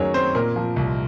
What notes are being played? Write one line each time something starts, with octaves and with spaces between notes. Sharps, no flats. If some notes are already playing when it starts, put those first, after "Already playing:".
Already playing: F#2 D#3 F#3 G#4 A#4 C#5
C4 C5
A#2 A#4
F3
C2